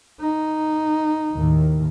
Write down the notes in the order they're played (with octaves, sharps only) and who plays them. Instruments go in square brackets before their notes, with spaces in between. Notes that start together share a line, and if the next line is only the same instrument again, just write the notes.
[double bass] D#4
[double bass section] D#2 A2 D#3